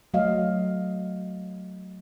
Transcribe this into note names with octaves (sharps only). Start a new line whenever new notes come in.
F#3 A3 F#4 D#5 F5